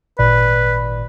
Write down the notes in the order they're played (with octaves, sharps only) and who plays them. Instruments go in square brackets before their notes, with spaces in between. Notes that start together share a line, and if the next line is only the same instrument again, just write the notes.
[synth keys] G#1 A#2 D5 [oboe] B4